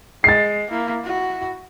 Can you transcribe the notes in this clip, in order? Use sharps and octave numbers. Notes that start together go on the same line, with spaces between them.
G#3 A6 C7
A#3 E4
E4 F#4